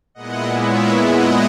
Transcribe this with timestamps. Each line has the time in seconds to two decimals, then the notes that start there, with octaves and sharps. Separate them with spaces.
0.15 A#2 G#3 B3 E4 D#5 F#5
0.59 C#5 E5
1.03 D#5 F#5